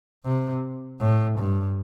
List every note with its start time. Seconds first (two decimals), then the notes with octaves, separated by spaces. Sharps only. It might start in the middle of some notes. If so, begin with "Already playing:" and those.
0.25 C3
1.01 A2
1.39 G2